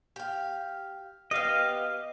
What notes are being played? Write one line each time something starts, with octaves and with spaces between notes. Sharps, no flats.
G4 F5
B3 G4 D#5 F5